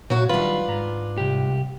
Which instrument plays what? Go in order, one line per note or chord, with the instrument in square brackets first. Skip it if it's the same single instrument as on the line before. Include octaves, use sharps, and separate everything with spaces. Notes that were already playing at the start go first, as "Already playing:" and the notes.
[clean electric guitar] A#2 [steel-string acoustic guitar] F#3 F#4
[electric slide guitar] D#3 F#3 G3 [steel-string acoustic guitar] D4 F4 [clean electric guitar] B4
[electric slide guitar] G#2 A#5
[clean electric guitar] C2 G4